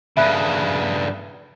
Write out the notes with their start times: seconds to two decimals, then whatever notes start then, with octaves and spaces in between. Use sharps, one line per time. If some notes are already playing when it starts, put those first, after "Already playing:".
0.17 G2 C#3 E5 B5 F#6